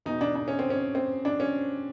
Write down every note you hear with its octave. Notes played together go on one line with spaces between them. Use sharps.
E2 B2 D#4
D4
D4
C#4
C4
C#4
C4
D4
C#4